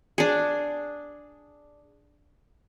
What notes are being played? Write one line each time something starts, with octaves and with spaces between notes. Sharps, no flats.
D4 G#4